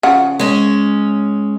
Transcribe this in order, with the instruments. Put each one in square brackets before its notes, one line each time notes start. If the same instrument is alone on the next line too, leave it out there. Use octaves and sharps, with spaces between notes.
[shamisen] C#3 F3 F#5
[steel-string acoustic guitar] G#3 C#4